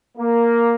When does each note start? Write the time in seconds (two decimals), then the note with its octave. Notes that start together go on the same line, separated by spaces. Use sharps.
0.17 A#3